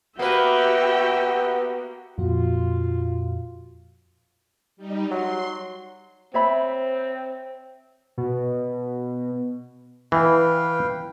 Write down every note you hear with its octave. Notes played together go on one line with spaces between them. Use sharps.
A#3 B3 F#4 G4 B4 E5 G5
F2 A#2 F4 F#4
G3 D#4
F#3 C6
C4 C#5 E5 B5
B2
E3 B4 F5 G5